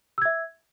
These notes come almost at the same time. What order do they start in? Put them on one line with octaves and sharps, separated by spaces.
E6 G#6 E5